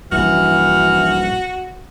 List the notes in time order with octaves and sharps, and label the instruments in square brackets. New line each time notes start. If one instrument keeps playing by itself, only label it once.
[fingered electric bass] A#1 G2 [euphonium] E3 [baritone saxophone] F#4 [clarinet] F6